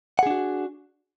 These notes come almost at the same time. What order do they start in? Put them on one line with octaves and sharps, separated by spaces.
F#5 G#4 D4 F#4